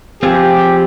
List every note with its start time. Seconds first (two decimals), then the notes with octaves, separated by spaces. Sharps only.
0.22 F3 C4 F4 G4 G#4